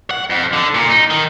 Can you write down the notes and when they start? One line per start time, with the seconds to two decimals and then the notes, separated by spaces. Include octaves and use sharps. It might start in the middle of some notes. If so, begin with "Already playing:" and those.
0.11 F#5
0.30 F2
0.53 D3
0.75 A#2
0.90 D#4
1.11 D#3